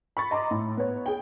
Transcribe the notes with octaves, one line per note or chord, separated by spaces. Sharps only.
B5 C#6 A6
D#5 A#5 C6 D6
A2
B3 C#5
G#4 G5